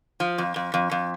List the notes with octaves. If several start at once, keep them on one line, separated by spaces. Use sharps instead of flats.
F3
F2
F2
F2
F2